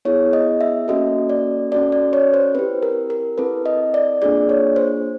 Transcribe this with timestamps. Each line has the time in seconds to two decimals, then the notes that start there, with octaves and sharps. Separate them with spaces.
0.05 B3 E4 G#4 C#5
0.33 D#5
0.61 E5
0.88 A#3 C#4 F#4 A4 D#5
1.29 D5
1.72 C#4 F#4 A4 D5
1.92 D5
2.13 C#5
2.34 C5
2.54 C4 E4 G4 B4
2.83 A#4
3.10 A#4
3.38 C4 E4 A4 B4
3.66 D#5
3.94 D5
4.22 A#3 D4 F4 G#4 D5
4.49 C#5
4.76 C5